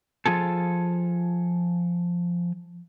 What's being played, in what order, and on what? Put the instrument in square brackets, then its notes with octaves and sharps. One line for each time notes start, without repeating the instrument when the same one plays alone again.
[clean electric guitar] F3 F4 G#4 A4